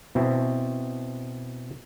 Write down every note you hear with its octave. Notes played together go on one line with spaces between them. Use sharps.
B2 C4 E4